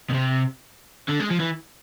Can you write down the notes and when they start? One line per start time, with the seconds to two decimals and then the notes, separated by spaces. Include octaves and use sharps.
0.10 B2
0.13 C3
1.09 D3
1.20 G#3
1.31 F3
1.40 E3